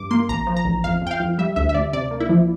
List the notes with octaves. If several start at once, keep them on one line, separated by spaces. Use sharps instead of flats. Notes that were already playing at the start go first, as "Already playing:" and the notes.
Already playing: G2 D6
A#3 C6
A1 A#5
F3
A#5
A1
F2 F5
F2
G5
F5
F2
G3 E5
D2 E5
E5
D2 D5
C3 D5
A#3
E4
F3